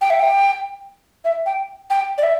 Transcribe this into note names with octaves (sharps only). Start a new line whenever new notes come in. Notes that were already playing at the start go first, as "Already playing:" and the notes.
G5
E5
G5
E5
G5
G5
D5
E5